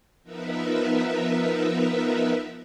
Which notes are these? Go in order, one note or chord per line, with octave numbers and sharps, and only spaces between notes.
F3 B3 D#4 A#4 B4 E5